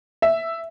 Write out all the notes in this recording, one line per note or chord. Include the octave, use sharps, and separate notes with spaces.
E5